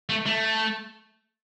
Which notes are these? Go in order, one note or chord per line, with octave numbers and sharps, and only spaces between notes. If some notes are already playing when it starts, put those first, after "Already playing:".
A3
A3